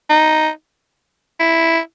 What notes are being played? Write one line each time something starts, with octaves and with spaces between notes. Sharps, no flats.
D#4
E4